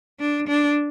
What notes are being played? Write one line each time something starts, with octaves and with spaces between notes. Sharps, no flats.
D4
D4